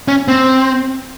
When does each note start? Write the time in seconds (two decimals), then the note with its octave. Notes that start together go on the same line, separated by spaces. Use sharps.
0.08 C#4
0.28 C4